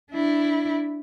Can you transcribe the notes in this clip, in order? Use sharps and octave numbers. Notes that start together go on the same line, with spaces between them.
D4 E4